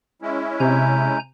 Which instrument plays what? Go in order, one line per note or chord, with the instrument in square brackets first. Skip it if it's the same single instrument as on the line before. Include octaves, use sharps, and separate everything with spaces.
[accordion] G#3 C#4 E4
[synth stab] C3 [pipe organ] G#5 A#5 G6